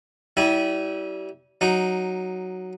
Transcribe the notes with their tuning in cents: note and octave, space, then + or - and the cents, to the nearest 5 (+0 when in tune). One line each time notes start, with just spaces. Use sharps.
G3 -35 E4 -20 G#5 +0
F#3 +0 D#4 +0